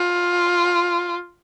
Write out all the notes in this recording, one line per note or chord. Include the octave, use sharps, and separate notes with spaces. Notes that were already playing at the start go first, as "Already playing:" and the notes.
Already playing: F4